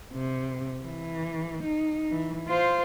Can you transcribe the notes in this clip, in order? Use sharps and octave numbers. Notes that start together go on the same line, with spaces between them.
C3
E3
D#4
E3
F4 C5